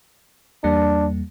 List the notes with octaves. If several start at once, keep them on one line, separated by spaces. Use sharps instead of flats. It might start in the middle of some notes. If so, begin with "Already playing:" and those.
E2 G3 A#3 D4